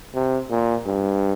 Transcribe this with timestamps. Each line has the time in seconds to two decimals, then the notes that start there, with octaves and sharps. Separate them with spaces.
0.15 C3
0.50 A#2
0.86 G2